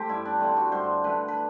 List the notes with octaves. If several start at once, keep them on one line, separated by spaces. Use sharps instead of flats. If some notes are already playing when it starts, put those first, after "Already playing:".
Already playing: A3 C4 G4
G2 E4
D4
D3 A3 C4
F#4
G2 C5
D3 A3 B4
B4